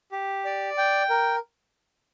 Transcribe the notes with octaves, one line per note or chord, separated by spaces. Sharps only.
G4
D5
G5
A#4